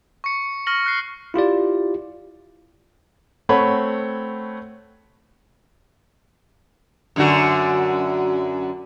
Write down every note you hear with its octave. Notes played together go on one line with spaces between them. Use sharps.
C#6 C#7
C#6 F6 A#6 F#7
F#6 C7
E4 F4 G4 D5
A3 C4 C#5 F#5 B5
F#2 D3 F#4